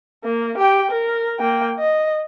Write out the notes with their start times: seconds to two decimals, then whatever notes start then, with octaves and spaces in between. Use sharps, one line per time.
0.24 A#3
0.58 G4 G5
0.91 A#4
1.40 A#3 G5
1.79 D#5